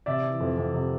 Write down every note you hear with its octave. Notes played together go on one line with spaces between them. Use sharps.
C3 D5 E5
E3
F2
F2
C3